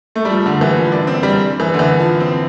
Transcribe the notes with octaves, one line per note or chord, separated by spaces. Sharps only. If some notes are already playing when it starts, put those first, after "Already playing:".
A3
G3
F3
D3
E3
F3
D4
C4
G3
E3
D3
E3
F3
C4